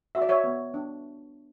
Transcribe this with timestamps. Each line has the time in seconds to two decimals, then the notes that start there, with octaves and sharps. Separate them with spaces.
0.15 F#4 E5
0.22 D5
0.29 C#5 E5
0.44 B3
0.74 D4